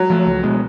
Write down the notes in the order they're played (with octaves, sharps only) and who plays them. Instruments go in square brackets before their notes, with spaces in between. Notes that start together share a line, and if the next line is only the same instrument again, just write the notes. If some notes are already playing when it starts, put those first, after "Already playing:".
Already playing: [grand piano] F#3
[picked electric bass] F3 A3
C#2
B2 G#3